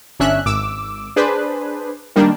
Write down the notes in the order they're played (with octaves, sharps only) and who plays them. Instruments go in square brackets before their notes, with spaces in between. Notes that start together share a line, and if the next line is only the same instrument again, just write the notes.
[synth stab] G1 C#4 D4 E5 F#6
G#1 D6 E6
D4 G#4 B4 C5
D#3 G3 A#3 D4